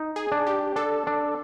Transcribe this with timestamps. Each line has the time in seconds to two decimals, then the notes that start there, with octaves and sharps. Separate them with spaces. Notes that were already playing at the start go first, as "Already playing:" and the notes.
Already playing: D#4
0.16 G#4
0.32 D4
0.47 G4
0.76 D4 A4
1.07 D4